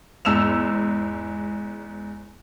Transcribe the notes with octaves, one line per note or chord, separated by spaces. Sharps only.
E2 G#2 E6 E7 F7